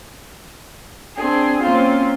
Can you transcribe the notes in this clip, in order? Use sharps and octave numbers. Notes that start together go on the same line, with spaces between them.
C4 D4 G#4
A#3 C4 C#4 F4